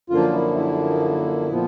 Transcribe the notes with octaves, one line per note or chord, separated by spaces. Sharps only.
F#2 D3 F3 A#3 F4
E4
E4
A#2 F3 B3